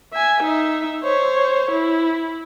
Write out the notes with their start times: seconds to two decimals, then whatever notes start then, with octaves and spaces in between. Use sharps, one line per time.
0.13 E5 G#5
0.43 D#4 E5
1.04 C5 C#5
1.71 E4